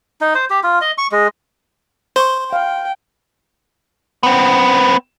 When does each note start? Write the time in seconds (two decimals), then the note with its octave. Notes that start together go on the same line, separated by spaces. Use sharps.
0.21 D#4
0.35 C5
0.50 G4
0.63 F4
0.81 D#5
0.98 C#6
1.12 G#3
2.16 C5 C6 C#6
2.53 F5 G5
4.23 B3 C4